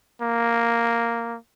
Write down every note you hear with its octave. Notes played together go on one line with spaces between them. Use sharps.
A#3